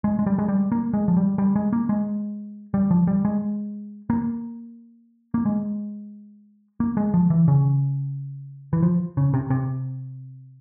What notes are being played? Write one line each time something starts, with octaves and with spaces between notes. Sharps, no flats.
G#3
G#3
G3
G#3
G3
A#3
G#3
F3
G3
G3
G#3
A#3
G#3
G3
F3
G3
G#3
A#3
A#3
G#3
A#3
G#3
F3
E3
C#3
E3
F3
C#3
C3
C3